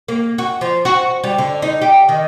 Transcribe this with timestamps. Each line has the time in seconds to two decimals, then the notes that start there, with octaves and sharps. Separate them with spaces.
0.08 A#3
0.38 F#4
0.61 F3
0.85 F#4
1.24 G3
1.38 D3
1.62 D#4
1.82 G4
2.09 D#3